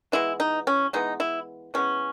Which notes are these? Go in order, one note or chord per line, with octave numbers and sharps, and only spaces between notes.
E3 G#3 B3 E4
D#4
C#4
E3 G#3 B3 D#4
E4
E3 G#3 B3 C#4